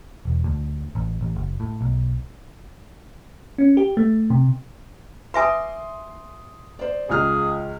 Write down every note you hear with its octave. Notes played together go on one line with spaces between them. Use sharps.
E1
D2
A1
A1
F#1
A2
B1
C#4
G4
A3
C3
B4 E5 G#5 C6 D6 D#6
C5 D5
C#2 F4 G#4 F6